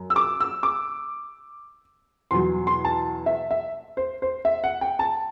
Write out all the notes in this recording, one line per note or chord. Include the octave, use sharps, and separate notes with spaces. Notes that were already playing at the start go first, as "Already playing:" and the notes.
Already playing: F#2
E6
D6
E6
D6
E2 B2 F#3 C6
C6
A5
E5
E5
C5
C5
E5
F#5
G5
A5